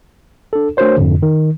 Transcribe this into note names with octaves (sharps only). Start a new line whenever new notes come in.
D4 A4
A3 D4 F#4 A#4 C5 C#5
F2 G#2 D3
D#3